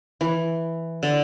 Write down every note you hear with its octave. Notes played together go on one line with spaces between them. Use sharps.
E3
D3